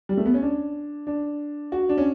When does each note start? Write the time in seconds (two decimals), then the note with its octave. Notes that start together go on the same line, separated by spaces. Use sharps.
0.09 G3
0.17 A3
0.26 B3
0.34 C#4
0.42 D4
1.07 D4
1.72 F#4
1.89 D4
1.98 C#4